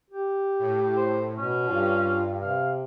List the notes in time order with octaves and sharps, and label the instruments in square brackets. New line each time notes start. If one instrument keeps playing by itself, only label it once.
[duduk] G4
[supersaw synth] A2
[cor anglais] C5
[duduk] B2 [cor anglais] C#4
[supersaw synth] G2 [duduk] F4
[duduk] C3 [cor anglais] F5